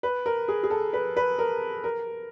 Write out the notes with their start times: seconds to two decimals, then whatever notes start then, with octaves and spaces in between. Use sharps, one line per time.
0.03 B4
0.26 A#4
0.48 G#4
0.63 G#4
0.70 A4
0.93 B4
1.16 B4
1.39 A#4
1.84 A#4